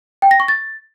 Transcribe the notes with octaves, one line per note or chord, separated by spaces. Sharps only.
G5
A#6
C#6
A6